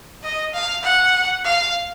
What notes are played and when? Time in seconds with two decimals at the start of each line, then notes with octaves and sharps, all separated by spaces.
0.23 D#5
0.54 F5
0.84 F#5
1.45 F5